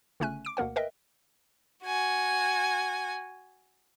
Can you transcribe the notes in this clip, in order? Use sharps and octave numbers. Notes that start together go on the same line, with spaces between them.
G1 C#3 A3 C#4 G#5 F#6
D6 D7
D2 B2 A#3 A#4 F#5
A#4 B4 D#5 E5 G5
F#4 G#5